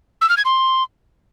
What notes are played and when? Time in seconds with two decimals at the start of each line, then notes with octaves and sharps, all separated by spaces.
0.21 E6
0.29 F6
0.37 G#6
0.45 C6